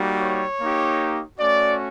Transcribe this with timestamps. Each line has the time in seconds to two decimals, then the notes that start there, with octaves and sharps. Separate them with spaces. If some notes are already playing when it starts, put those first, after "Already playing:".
Already playing: G3 A#3 D#4 F#4
0.21 C#5
0.59 A#3 D#4 G4
1.38 A3 C#4 F#4 D5